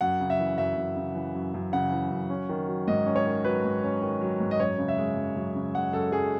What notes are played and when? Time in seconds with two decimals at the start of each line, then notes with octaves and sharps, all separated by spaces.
0.01 F#2 F#5
0.20 C#3
0.30 E5
0.39 E3
0.58 F#2 E5
0.77 F#2
0.96 C#3
1.15 E3
1.35 F#2
1.54 F#2
1.73 C#3 F#5
1.92 E3
2.11 F#2
2.30 C#4
2.49 D#3
2.68 F#3
2.88 G#2 D#5
3.06 C#4
3.16 C#5
3.26 D#3
3.45 F#3 B4
3.64 G#2
3.84 C#4
4.02 D#3
4.21 F#3
4.40 G#2
4.51 D#5
4.60 F#2 C#5
4.78 C#3
4.88 E5
4.98 G#3
5.16 F#2
5.36 F#2
5.55 C#3
5.74 G#3 F#5
5.93 F#2 A4
6.12 F#2 G#4